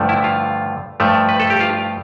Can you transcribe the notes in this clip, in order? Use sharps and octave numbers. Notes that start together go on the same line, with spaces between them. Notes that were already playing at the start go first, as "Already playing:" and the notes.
Already playing: G2 D3 F3 A3
E4
F4
G2 F3 A3
B4
A4
G4
F4